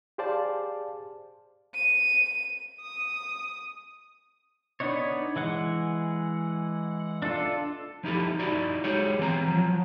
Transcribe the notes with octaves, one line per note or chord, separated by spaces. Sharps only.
G4 G#4 C5 D5 F5 A5
D#7
D#6
B3 D4 D#4 C#5
E3 G#3 F#5
D4 F4 A4
F3 D#4 E4 G4 A4
D#4 E4 F#4 D5
G#3 G4 G#4 C#5
E3 B3 C4 G5 A#5
F3 F#3